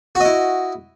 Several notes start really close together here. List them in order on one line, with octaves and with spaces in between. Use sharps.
F#4 D#5 E4